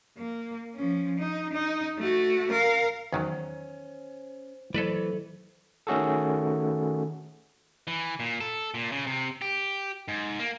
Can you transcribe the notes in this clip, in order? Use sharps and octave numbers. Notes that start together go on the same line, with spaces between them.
A#3
F3 C#4
D#4
D#4
A3 F#4
A#4 F5
E2 D#3 F#3 C#4 C5
E3 F#3 A3 A4 B4 C5 D5
D#3 A3 C#4 F#4 G#4 A4
E3
A#2
A4
A#2
C#3
C3
G4
G#2
A#3